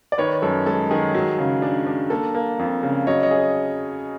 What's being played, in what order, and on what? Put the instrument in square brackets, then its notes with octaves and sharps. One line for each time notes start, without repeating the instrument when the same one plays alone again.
[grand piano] D5
[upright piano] D#3 [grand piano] B4 C#5
[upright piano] F#2 [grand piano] A4
[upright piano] G#3 [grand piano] A4
[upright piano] D#3 [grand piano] G#4
[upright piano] F#3
C#3
D4
D4
[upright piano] A#3 [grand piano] A4
[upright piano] A#3
F2
C#3
[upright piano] F#3 [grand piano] C#5 D#5
[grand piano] C#5 D#5
[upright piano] G#4